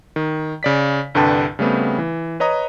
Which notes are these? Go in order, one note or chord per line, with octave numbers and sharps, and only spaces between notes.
D#3
C#3 D5 B6
C2 G2 D3 B4 G5 A5
C#3 G3 A3 B3 C4
E3
B4 C#5 D#5 A#5 D#6